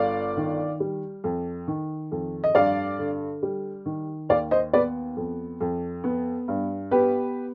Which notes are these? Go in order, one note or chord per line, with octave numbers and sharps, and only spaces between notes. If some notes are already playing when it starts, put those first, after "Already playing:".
Already playing: G1 D5 F5
D#3
G3
F2
D#3
F2
D#5
G2 D5 F5
D3
G3
D#3
D#2 D5 F5
C5 D#5
B3 B4 D5
F2
F2
B3
G2
B3 G4 B4